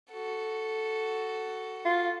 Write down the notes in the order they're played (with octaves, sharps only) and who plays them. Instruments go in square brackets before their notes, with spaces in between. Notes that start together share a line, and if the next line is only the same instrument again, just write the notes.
[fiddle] F#4 A4
[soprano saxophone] F4